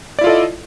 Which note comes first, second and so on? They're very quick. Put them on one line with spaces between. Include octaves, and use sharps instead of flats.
D5 E4 F4 A4 D#5